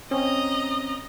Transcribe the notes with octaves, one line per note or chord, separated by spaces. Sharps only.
C4 C#4 D#5 A#5